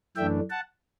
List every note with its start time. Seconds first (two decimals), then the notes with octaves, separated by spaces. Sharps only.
0.16 F#2 E3 A3 D4 E5 G5
0.50 F#5 A5